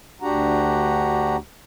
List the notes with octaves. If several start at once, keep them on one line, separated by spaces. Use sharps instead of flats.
D2 D4 F#4 G4 F#5 A#5